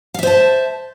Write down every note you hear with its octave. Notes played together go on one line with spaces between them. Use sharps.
C5 E5 F5 A5